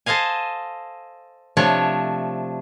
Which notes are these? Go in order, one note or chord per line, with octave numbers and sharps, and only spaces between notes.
A4 C5 D#5 F5 G#5
C3 F3 A3 D4 C#5